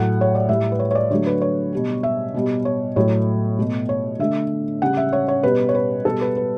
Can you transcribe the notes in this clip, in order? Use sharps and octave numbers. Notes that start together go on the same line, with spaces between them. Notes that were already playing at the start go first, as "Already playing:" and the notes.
Already playing: A2 F#3 A3 F#5
C#5
D5
A2 G3 E5
B4
C#5
C#5
D5
D3 F#3 A3 C#5
B4
C#5
B2 G3
E5
B2 G3
C#5
A2 F#3 A3 C#5
B2 A3
C#5
D3 A3 E5
C#3 G3 F#5
E5
C#5
C#5
B2 G3 B4
C#5
B4
B2 G3 A4
B4
B4